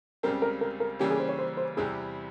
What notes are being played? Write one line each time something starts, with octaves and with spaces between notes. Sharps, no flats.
C#2 C#3 G3 C4 A#4
A#4
A#4
A#4
C#3 E3 G3 A#3 C#4 G4
G#4
C5
C#5
C5
C5
E2 C3 G3 C4 E4 G#4